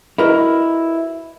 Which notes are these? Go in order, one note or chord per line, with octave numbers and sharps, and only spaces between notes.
E4 F#4 A#4 B4 D#5